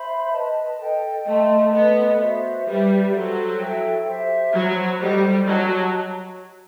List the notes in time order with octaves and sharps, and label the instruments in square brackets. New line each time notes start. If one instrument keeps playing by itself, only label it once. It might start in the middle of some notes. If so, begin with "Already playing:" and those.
Already playing: [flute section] C5 E5 B5
B4 D#5 A5
A4 D#5 G5
[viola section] A3 [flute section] A4 D#5 A5 C6
[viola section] B3 [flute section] A4 D#5 F#5 B5
[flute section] F#4 C5 E5
[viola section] G3 [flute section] G4 B4 E5
[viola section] F#3 [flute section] F#4 A4 C5
[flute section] E4 A4 E5 G5
G4 C5 E5
[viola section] F#3 [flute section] F#4 C5 F#5 B5
[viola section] G3 [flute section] F#4 A4 C5 D#5
[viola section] F#3 [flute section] G4 D#5 A5